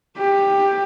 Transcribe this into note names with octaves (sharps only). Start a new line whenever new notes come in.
G4